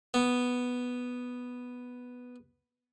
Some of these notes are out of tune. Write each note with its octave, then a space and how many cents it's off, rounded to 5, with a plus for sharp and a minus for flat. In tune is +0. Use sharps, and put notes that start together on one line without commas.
B3 +0